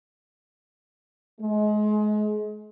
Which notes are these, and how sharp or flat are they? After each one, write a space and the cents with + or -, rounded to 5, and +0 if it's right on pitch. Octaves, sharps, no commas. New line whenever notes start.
G#3 +30